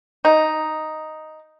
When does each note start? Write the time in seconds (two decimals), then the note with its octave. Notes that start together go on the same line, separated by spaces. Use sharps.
0.25 D#4